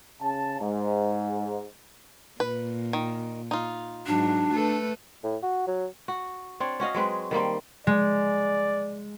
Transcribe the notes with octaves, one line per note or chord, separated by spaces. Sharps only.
C#3 A5
G#2
A#2 B4
D#3
D#4 F4
G#2 F#3 D4
A3 A4 B4
A2
F#4
F#3
F#4
C4 D4 C#5
C#4 F#4 D#5 F5
F#3 G#3 C4 B4
D#3 G3 A#3 C4
G#3 D5